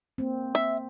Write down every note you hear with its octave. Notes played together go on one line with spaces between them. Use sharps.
A#3 C4
E5